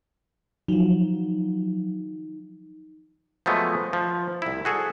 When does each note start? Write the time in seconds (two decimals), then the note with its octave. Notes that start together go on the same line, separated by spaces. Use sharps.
0.68 F3 F#3 D#4
3.46 F3 F#3 G#3 A3 B3
3.93 F3
4.42 C2 E4
4.65 F#4 G#4 A4